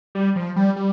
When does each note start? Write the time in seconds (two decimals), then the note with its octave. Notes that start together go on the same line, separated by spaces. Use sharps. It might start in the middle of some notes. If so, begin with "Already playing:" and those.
0.15 G3
0.36 F3
0.56 G3
0.76 G3